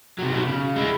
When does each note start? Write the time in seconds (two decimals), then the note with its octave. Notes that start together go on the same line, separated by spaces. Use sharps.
0.19 C3 F#3
0.32 B2 F#3
0.48 C#3
0.76 G#3 E4